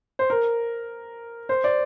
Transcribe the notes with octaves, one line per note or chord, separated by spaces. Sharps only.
C5
A#4
C5
D5